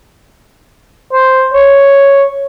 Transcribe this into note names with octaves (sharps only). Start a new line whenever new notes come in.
C5
C#5